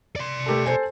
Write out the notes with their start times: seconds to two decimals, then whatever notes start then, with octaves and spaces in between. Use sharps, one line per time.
0.16 D5 C6
0.46 A3 G4 A4
0.66 A4 C5 G#5